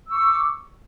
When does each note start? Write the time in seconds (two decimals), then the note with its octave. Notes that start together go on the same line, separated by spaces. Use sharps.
0.08 E6
0.12 C#6
0.15 D6